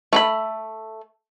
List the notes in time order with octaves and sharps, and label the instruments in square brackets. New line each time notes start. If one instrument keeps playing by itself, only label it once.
[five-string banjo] A3 A#5 B5